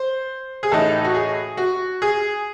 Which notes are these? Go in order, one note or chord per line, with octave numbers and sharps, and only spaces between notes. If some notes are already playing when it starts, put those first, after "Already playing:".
Already playing: C5
G#4
A2 E3 A3 D#4 A4
F#4
G#4
F#4
G#4